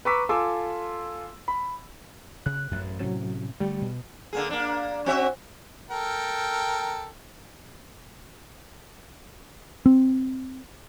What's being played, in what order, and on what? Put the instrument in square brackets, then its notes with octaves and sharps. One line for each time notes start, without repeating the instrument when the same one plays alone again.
[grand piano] B4 A#5 C#6 D6 E6 B6
F4 A4 G#5 C6 D6 E6
B5
[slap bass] C#3 [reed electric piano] F#6
[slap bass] A1 F#2
[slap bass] A2 C3 C#4 [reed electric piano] F#3
[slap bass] D3 A3 [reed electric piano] G3
[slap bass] B2
[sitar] D3 A#3 G#4
A#3 D4
C4 F#4 E5
[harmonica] A4 A#4 G5
[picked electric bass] C4